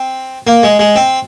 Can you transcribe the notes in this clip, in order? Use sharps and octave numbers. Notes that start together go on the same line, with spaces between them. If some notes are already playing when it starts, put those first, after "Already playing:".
Already playing: C4
A#3
G#3
G#3
C4